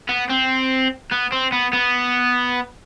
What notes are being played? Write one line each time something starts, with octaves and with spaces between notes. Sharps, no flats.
B3
C4
B3
C4
B3
B3